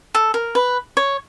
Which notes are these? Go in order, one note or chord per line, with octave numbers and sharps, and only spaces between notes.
A4
A#4
B4
C#5